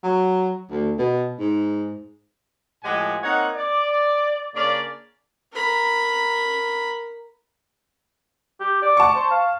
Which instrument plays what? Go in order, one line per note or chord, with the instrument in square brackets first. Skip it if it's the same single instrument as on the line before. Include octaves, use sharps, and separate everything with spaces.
[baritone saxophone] F#3
D2
B2
G#2
[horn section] A2 F3 G#3 G4 F#5 G#5
A#3 C4 D#4 C#5 F#5
D5
C#3 A#3 C#4 D4 D5
[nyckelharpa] A#4 B5
[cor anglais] G4
D5
[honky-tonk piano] A5 C#6
[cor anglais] C5
F5